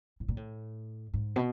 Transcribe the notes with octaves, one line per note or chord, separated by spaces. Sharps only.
A2
A#2
A2
G#2
B2